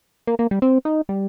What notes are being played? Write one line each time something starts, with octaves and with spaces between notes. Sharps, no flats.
A#3
A#3
G3
C4
D#4
G3